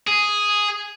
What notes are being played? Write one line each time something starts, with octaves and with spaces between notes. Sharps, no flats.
G#4